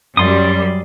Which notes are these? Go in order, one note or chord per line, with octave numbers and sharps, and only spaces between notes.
F#2 G3 D5 C6 D#6